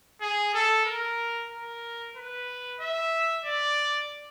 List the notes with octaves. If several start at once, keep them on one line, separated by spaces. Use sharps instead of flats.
G#4
A4
A#4
A#4
B4
E5
D5